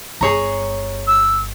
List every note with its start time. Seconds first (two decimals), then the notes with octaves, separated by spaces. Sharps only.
0.21 G1 G#4 C#5 A#5
1.07 E6